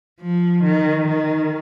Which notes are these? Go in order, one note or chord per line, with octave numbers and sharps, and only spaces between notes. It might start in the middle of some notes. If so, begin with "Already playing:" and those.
F3
D#3
D#3